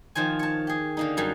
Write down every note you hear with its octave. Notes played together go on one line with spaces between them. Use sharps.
D#3 F3 C5 G#5
C#5 A5
G4 G#4
D3 A#3 D#4
F#2 F#3 G3